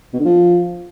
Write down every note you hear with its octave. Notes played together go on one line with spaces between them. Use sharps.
B2
D3
F3